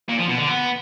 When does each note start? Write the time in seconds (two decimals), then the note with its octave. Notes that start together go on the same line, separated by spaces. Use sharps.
0.09 A#2
0.18 F3
0.28 B2
0.38 D3
0.47 B3